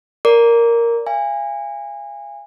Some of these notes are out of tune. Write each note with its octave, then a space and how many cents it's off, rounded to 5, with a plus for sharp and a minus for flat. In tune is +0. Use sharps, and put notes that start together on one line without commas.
A#4 +0 D5 -20 D6 -25
F5 -30 G#5 -25